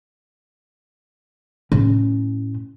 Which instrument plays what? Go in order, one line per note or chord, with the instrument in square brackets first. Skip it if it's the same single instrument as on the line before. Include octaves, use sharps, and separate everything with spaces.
[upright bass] A2 C#4